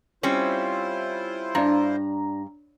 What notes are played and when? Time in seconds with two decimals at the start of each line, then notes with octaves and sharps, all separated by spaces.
0.23 G3 C4 C#4 E4 F4 C5
1.55 G2 D4 A#5